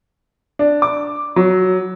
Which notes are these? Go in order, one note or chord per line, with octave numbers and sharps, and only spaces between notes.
D4
D6
F#3